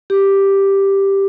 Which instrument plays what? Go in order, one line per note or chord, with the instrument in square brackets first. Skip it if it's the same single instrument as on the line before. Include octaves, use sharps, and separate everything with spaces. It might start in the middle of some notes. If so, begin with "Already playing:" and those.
[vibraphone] G4